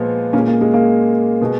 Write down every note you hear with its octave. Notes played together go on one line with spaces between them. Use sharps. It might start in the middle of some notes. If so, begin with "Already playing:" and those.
Already playing: A#2 F3 G#3 B3
A#2 G#3 A#3 C#4
A#3
G#3
A#3
B2 G#3